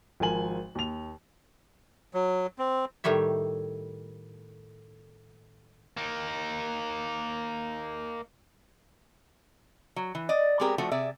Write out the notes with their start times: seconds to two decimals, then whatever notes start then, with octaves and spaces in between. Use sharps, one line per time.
0.20 G#1 F3 A#4 G#5 F#7
0.75 D#2 F7
2.14 F#3
2.59 C4
3.04 A2 D#3 G3 C#5 E5
5.97 A#3 D#4
9.96 F#3
10.15 E3
10.29 D5 D#5
10.60 G#3 B3 C4 G4 G#4 A#4
10.78 F3 A3 D4 F#4
10.92 C3 G#4 D5 E5